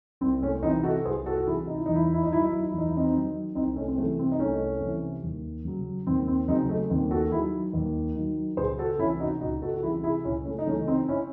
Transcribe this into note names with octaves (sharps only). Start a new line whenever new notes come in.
C2 C4
A3 C#4
C3 E3 C4 D#4
F#4 A4
C2 G#4 C5
F#4 A4
F#4
C3 E3 E4 G#4
D#4
E4
E2 D#4
E4
D#4
E4
D#4
D#3 F#3 E4
D#4
E4
D#4
E2 E4
D#4
E4
C4 D#4
D#3 F#3
C2 C4 D#4
A3 C#4
C4
C3 E3 A3
C4
D#4
C2 A3 C#4
C3 E3
D#2
C#3 F#3
D#2 C4
C4
C#3 F#3 C4 D#4
A3
D#2 C4
F#4 A4
D#3 F#3 E4 G#4
D#2
D#3 F#3
C#2 G#4 C5
F#4 A4
C3 E3 C#4 E4
D#4 F#4
C#2 D#4 F#4
F#4 A4
F#4
C3 E3 E4 G#4
E4 G#4
C#2 C#4 E4
A3 C#4
D#4
C#3 E3 A3 C#4
C4 D#4
C#4 E4